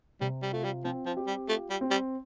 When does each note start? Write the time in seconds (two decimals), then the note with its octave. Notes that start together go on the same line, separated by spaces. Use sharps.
0.21 C3 G3
0.43 G3
0.52 A3 F4
0.64 G3
0.84 F3 C4
1.06 F3
1.17 G4
1.27 G3
1.49 A3 F4
1.70 G3
1.81 C4
1.91 G3